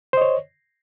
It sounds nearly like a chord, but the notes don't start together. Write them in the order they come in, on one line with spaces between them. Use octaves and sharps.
C5 D#5 C#5